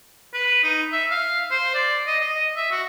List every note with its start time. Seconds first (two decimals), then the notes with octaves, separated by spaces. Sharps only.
0.34 B4
0.63 D#4
0.92 E5
1.10 F5
1.51 C5
1.74 D5
2.06 D#5
2.20 D#5
2.56 E5
2.71 F#4